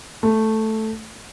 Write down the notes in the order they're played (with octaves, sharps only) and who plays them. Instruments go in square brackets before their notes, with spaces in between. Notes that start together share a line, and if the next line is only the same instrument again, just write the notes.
[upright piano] A3